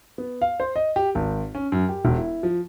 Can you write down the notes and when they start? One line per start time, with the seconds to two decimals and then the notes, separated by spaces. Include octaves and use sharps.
0.18 B3
0.41 F5
0.60 C5
0.76 D#5
0.96 G4
1.15 G#1
1.55 C#4
1.72 F#2
1.89 G4
2.05 E1
2.18 E4
2.43 F3